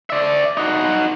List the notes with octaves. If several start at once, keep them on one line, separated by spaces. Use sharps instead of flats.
D5 E5
D#4 F#4